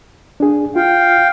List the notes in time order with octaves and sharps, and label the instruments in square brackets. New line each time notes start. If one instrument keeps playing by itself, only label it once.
[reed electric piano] D4 G#4
[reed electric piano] F4 [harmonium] F5 G5